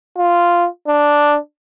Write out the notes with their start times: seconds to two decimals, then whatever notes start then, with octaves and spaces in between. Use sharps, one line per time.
0.18 F4
0.88 D4